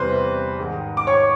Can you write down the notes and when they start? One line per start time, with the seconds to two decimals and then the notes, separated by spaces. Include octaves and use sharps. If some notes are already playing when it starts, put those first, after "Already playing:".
Already playing: E2 C3 E3 G3 B4 C5 C6
0.59 G#2 D#3 G#3
0.97 D6
1.07 C#5 C#6